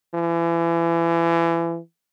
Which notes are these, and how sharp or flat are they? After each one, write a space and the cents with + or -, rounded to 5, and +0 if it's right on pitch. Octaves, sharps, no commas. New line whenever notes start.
E3 +30